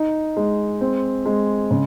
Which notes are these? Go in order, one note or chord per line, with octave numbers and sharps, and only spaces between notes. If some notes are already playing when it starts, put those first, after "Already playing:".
Already playing: D#4
G#3
C4
G#3
C#3